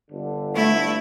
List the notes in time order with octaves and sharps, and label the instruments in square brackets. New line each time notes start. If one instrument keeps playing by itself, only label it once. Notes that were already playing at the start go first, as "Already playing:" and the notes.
[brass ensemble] G1 D3
[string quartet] A3 E4